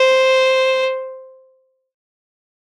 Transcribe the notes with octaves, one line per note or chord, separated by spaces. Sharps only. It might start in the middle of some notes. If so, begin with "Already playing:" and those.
Already playing: C5